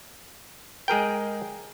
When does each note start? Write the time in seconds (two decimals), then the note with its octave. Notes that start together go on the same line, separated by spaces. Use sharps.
0.88 G#3 G#4 A#4 G5